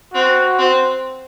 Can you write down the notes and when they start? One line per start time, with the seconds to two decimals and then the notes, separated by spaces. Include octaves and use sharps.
0.14 C4 F#4
0.59 C4